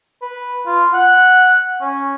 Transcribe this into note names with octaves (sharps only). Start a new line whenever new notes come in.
B4
F4
F#5
C#4